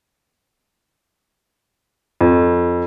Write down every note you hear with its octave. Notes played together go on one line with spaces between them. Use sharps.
F2